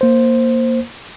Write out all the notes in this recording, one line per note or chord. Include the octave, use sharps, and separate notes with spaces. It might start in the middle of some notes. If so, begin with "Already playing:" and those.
A#3 C5